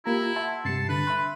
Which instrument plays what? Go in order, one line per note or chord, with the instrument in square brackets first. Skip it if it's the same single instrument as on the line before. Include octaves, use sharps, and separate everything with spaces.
[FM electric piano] A#3 A#5 [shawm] E4 [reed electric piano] F4 G4
[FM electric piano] E5 [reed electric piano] F#5 A5 C6
[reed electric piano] G2 G3 [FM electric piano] C3 C7 C#7 [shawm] A5
[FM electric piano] D3 [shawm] B4
[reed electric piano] E5 B5 C6 [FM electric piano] F#6